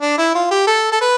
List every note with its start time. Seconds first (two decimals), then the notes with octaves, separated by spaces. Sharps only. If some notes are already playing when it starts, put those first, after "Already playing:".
0.01 D4
0.18 E4
0.35 F4
0.51 G4
0.67 A4
0.92 A4
1.01 B4